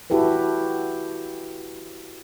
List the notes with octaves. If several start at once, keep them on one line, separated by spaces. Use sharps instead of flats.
E4 F#4 G4 A4 B4